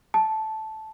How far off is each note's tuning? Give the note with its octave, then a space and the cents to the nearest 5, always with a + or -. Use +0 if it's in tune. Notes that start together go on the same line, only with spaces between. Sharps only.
A5 -10